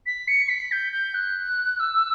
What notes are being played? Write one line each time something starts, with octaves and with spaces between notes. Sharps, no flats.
B6
C#7
B6
G6
G6
F#6
E6